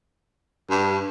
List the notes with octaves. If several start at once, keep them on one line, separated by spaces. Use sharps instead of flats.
G2